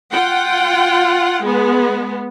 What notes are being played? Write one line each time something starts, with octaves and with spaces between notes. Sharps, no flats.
F4 F#5 G5
G#3 B3